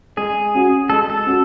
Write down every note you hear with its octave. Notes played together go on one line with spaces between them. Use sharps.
G#3 G#4
C#4 F#4
G#3 A4
A4
C#4 F#4